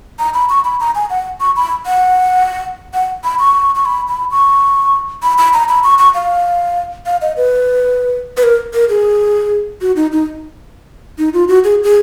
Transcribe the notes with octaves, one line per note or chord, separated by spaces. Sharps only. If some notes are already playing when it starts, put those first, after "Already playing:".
A#5
B5
C#6
B5
A#5
G#5
F#5
C#6
B5
F#5
F#5
B5
C#6
C#6
B5
B5
C#6
B5
B5
A#5
B5
C#6
C#6
F5
F5
D#5
B4
B4
A#4
A#4
G#4
F#4
D#4
D#4
D#4
F4
F#4
G#4
G#4